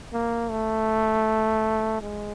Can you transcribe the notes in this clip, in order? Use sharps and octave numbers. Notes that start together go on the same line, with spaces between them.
A#3
A3
G#3